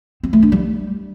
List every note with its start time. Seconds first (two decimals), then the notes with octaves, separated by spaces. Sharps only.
0.23 C4
0.33 A3
0.42 D4
0.52 G3